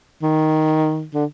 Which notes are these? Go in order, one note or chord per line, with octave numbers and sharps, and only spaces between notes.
D#3
D3